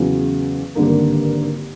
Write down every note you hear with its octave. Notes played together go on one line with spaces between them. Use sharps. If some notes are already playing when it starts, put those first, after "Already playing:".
Already playing: E2 C#3 F#3
G#1 G2 D3 G3 A#3